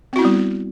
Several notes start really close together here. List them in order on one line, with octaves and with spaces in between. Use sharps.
C4 F#4 E4 B3 G3